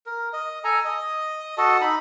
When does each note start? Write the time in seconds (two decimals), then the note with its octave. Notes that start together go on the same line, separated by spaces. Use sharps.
0.06 A#4
0.33 D#5
0.64 A4 G#5 A#5
0.85 D#5
1.58 F#4 A4 D#5 A5
1.81 D#4 B5